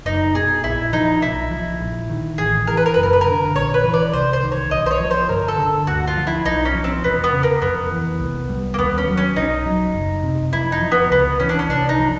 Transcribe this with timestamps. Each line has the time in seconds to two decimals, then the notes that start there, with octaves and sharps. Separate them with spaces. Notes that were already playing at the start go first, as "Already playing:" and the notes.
0.06 F#1 D#4
0.35 B2 G#4
0.64 A#1 E4
0.93 F3 D#4
1.22 B1 E4
1.51 F3
1.81 A#1
2.10 D#3
2.38 A1 G#4
2.67 E3 A#4
2.77 B4
2.86 A#4
2.94 F#1 B4
3.03 A#4
3.13 B4
3.21 A#4
3.26 D3
3.54 A#1 C#5
3.74 B4
3.84 E3
3.94 D5
4.13 C2 C5
4.33 C5
4.42 D#3
4.52 C#5
4.71 B1 D#5
4.86 C5
4.91 C#5
5.00 F3
5.11 C5
5.29 G1 A#4
5.48 A4
5.58 D3
5.87 D2 F#4
6.07 F4
6.17 F3
6.27 E4
6.45 B1 D#4
6.65 C#4
6.75 F3
6.84 C4
7.04 E1 B3
7.24 B3
7.33 C#3
7.43 A#3
7.62 F2 B3
7.91 E3
8.20 C2
8.49 G3
8.74 A#3
8.79 D#2 B3
8.98 C#4
9.08 F#3
9.17 C#4
9.36 B1 D#4
9.66 F#3
9.95 F#1
10.23 C3
10.53 F2 E4
10.72 D#4
10.82 F3
10.91 B3
11.11 C#2 B3
11.40 E3 C#4
11.49 D4
11.59 C#4
11.70 C2 D4
11.89 D#4
11.99 F3